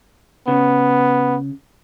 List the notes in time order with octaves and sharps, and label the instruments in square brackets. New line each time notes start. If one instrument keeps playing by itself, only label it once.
[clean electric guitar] C#3 [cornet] B3